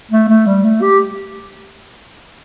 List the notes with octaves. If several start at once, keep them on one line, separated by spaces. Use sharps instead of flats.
A3
A3
G3
A3
G4